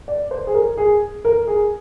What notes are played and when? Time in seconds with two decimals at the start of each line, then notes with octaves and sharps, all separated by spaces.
0.08 D5
0.31 C5
0.47 G#4
0.55 A#4
0.77 G#4
1.25 A#4
1.47 G#4